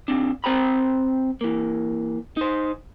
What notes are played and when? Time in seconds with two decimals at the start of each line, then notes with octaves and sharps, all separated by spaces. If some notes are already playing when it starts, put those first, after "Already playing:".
0.08 D#3 C4 D4
0.44 C4 C5 G5 A#5 B5
1.41 E3 A#3
2.37 D#4 C5